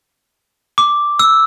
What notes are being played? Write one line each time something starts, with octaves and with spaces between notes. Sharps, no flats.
D6
E6